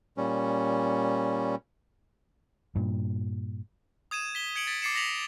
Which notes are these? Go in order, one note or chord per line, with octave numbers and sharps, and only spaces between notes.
A#2 G3 C#4
G2 A#2
D#6 G#6 D#7 E7
B6 G7
G#6 C#7 D7 F#7
A6 B6 D7
D6 A6 C7 C#7 E7
D6 A#6 B6 F7 F#7